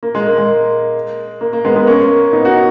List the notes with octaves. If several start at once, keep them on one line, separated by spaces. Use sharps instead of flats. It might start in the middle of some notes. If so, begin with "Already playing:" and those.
A#3
G#3
A#3
G#3
A#3
A#3
G#3 B3
G#3 B3
A#3 C#4
B3 D#4
D#4 F#4